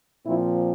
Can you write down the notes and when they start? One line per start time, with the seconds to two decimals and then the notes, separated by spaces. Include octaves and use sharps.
0.25 A#2 F3 C4 E4